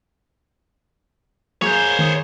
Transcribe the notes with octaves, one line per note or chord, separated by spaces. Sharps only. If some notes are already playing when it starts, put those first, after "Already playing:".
F#3 A#3 G#4 C5 C#5
D#3 D#6